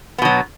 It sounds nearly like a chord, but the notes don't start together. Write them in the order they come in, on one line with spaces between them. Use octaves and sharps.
B3 B2 F#3